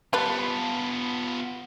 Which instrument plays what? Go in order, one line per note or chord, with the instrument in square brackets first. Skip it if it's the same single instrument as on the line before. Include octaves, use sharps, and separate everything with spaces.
[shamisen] G3 B4 [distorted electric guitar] B3 F4 [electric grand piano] A5 B5